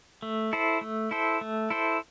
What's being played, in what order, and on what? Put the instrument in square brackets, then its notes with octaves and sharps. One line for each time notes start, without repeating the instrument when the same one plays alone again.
[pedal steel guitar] A3
E4 A4 C5
A3
E4 A4 C5
A3
E4 A4 C5